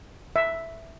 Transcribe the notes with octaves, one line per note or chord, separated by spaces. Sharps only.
E5